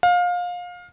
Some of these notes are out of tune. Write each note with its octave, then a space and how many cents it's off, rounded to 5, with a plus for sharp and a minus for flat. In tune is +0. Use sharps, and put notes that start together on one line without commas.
F5 +25